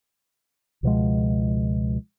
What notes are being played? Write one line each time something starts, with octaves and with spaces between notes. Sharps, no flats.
C#2 B2 F3 G#3